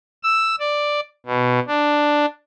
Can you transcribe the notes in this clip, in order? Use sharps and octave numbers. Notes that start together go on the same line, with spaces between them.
E6
D5
B2
D4